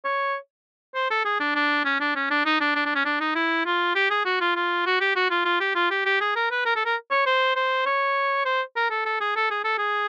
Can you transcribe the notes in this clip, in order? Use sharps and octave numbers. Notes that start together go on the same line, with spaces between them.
C#5
C5
A4
G#4
D4
D4
C#4
D4
C#4
D4
D#4
D4
D4
D4
C#4
D4
D#4
E4
F4
G4
G#4
F#4
F4
F4
F#4
G4
F#4
F4
F4
G4
F4
G4
G4
G#4
A#4
B4
A#4
A4
A#4
C#5
C5
C5
C#5
C5
A#4
A4
A4
G#4
A4
G#4
A4
G#4